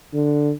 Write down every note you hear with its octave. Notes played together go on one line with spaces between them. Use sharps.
D3